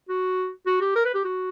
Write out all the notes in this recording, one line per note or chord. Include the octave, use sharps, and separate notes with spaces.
F#4
F#4
G4
A#4
B4
G4
F#4